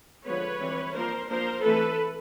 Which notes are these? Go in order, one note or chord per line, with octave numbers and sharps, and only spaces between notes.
D3 F3 G#3 B3 B4 C#5
E3 G3 C4
F3 A#3 D4 A#4 C5
F3 A#3 D4 A#4 C5
E3 A3 C4 A4 B4